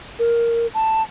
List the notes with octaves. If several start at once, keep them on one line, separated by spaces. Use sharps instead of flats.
A#4
A5